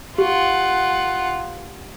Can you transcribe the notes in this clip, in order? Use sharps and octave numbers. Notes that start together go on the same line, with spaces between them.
F4 G4 F#5